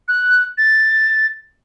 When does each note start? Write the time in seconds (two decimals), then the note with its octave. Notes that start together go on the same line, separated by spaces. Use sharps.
0.08 F#6
0.58 A6